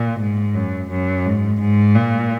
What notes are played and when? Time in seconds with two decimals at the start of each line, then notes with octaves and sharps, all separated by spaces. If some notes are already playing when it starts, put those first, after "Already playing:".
Already playing: A#2
0.20 G#2
0.55 F#2
0.90 F#2
1.26 G#2
1.61 G#2
1.95 A#2